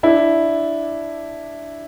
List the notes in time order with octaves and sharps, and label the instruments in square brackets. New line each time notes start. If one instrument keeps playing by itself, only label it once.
[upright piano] D4 E4